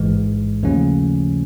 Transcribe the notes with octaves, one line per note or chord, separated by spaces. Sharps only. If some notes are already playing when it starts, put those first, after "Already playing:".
Already playing: A1 G#2 E3 G#3
D#2 C#3 F3 A3 C#4